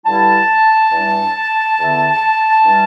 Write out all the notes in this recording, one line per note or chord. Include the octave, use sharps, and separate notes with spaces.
G2 D3 G3 E4 A5
E2 E3 G3 D4
E2 D3 B3 E4
E3 G3 D4